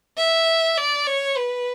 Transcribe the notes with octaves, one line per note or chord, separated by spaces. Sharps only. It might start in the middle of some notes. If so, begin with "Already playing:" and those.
E5
D5
C#5
B4